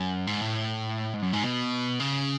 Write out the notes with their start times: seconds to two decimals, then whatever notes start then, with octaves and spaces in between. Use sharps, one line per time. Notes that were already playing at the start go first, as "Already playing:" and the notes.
Already playing: F#2
0.27 G#2
0.42 A2
1.14 G#2
1.23 F#2
1.33 G#2
1.43 B2
2.00 C#3